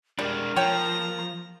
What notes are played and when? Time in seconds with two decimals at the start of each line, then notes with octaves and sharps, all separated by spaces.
0.19 G3 G#3 D4 A#4
0.56 F3 C#5 G5 A#5